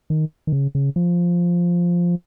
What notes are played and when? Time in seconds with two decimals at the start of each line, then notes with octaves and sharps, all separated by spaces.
0.10 D#3
0.47 D#3
0.53 C#3
0.75 C#3
0.96 F3